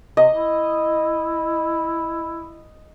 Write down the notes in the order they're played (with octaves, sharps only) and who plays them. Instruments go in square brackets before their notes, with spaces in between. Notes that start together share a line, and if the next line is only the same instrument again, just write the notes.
[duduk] C3 [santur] D#5
[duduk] E4